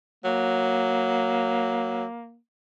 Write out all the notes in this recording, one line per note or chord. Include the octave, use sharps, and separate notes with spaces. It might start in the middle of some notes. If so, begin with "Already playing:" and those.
F#3 A#3